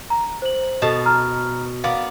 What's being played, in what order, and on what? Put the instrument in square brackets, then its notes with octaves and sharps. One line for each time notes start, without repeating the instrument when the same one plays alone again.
[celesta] A#5
C5 F#7
[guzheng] B2 A5 [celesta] A4 D#5
[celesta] A#5 F6
[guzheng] B3 A#4 D5 [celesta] F5